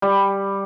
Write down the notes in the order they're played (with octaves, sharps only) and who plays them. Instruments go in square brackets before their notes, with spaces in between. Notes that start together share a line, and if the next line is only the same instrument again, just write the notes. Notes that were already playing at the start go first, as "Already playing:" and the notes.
[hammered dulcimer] G3